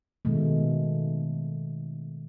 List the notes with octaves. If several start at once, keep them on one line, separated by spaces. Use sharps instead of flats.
B2 D#3 G#3 A3